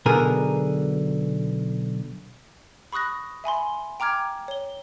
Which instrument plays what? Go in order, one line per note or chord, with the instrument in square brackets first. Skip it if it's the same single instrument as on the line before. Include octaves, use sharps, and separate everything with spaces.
[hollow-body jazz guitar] B1 B2 D3 G#4 A#4
[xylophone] B5 C#6 D#6 F#6 A#6
E5 G#5 B5 C6
G5 A#5 D6 F6 G#6
C#5 G7